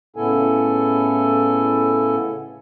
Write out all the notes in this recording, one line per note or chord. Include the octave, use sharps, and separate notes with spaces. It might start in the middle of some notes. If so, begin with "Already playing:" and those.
A2 C#3 B3 E4 A4 G#5